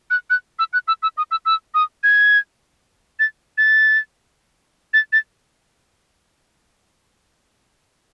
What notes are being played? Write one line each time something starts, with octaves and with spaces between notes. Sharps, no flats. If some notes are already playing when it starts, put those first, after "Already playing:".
F#6
F#6
E6
F#6
E6
E6
D#6
E6
E6
D#6
G#6
A6
A6
A6
A6